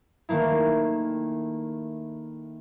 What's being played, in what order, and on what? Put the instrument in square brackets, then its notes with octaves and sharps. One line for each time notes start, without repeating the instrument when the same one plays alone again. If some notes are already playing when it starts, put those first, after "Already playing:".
[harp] D#3 A3 A#3 E4